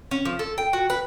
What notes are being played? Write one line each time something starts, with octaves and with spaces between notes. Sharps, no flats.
C#4
F3
A4
G5
F#4
B4